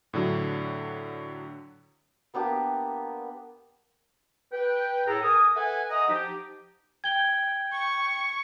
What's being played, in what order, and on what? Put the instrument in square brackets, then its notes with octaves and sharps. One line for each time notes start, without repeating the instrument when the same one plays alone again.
[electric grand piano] A2 D3 F#3
[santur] A#3 B3 D4 G4
[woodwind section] B4 G5
A2 G#4 A4 A#5
A#4 G#5 D#6
A4 B4 E5 F#5 G#5
D#5 F#5 A#5 D#6
F3 D#4 G4
[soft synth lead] G5 [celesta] G#6 G7
[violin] C#6